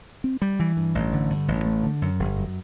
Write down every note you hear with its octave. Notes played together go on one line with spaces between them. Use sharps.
C4
G3
E3
G2
A1
D3
G2
A1
A3
D3
F#2
G1
F#2